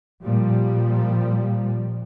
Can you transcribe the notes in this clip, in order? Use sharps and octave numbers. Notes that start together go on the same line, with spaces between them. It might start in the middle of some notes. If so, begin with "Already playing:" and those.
A#2 F3 G3